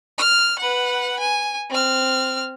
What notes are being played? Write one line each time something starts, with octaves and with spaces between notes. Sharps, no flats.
F6
B4 F#5
G#5
C4 F6